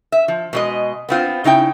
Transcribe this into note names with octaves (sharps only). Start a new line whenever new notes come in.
E5
F3
B2 G#3 D#5
B3 C4 F4
C#3 D#4 E4 G5